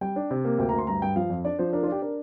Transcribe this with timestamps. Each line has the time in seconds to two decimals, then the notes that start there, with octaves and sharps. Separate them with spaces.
0.01 G3 G5
0.16 D4
0.31 C3
0.45 A#3
0.58 D2 G5
0.69 A#5
0.73 D2
0.79 C6
0.87 G2 A#5
1.02 G2 G5
1.16 F3 F5
1.30 F2
1.45 D4 D5
1.59 F3 C5
1.73 D4 A#4
1.83 F4
1.88 D4 G4
2.02 D4 A#4